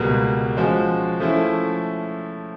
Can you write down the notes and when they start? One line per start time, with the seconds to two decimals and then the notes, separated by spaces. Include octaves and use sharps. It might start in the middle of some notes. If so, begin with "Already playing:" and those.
Already playing: C#2 B2 G3 A#3
0.57 F3 G#3 C#4 F#4
1.20 F3 A3 C#4 E4